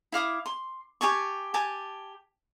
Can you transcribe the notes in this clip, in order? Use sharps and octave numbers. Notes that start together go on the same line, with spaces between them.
E4 F5 D6 D#6
C6
G4 G#5 A5 C#6
G4 G#5 A5